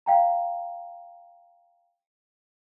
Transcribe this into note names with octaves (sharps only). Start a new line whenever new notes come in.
F5 G5 A#5